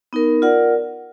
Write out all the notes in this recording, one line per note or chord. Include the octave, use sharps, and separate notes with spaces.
B3 D#4 A#4
F4 A#4 D5 F#5